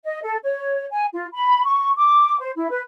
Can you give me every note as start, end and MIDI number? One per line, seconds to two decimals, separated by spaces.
0.04 0.19 75
0.22 0.36 69
0.43 0.86 73
0.90 1.05 80
1.13 1.25 65
1.33 1.63 83
1.64 1.91 85
1.96 2.35 86
2.39 2.50 72
2.56 2.67 64
2.70 2.80 71